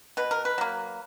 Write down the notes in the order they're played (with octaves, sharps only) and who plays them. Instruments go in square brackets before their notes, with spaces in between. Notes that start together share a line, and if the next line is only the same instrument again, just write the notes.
[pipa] B2 B4
A#4
B4
F#3 A#3